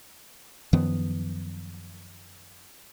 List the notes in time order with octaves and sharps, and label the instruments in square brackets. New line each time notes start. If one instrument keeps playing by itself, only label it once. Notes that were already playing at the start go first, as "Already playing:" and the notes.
[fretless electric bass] F#2 D#3 F3 B3